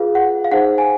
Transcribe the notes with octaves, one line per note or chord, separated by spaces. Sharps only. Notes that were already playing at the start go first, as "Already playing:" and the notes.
Already playing: F4 G#4 B4 F5
F#5
F5
D#4 G#4 C5 F#5
G#5